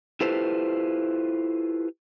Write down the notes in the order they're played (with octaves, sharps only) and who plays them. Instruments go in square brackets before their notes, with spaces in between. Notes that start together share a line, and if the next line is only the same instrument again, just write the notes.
[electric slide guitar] E4 F4 G4 A4 B4 C5